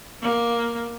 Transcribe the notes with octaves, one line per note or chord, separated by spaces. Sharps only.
A#3